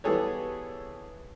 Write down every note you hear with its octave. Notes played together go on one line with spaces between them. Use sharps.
E3 G3 B3 G#4 A4 C#5